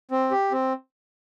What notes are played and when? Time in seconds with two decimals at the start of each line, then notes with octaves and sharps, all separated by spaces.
0.11 C4
0.31 G4
0.52 C4